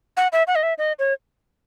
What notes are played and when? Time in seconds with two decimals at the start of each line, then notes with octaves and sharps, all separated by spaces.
0.17 F#5
0.32 E5
0.47 F#5
0.56 D#5
0.63 E5
0.78 D#5
0.99 C#5